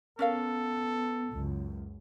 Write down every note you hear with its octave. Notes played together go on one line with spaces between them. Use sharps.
B3 C#4 A4 A#4 F5
C#2 F#2